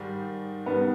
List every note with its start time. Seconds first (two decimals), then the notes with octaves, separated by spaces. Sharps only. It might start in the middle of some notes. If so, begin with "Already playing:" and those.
Already playing: G#2 D#3 G3
0.66 G#2 D#3 G3 B3